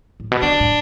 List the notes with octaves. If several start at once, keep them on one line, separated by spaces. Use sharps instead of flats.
A2
B2
D3 D4
A2